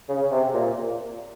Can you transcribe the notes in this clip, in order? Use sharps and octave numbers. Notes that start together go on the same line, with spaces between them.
C#3
C3
A#2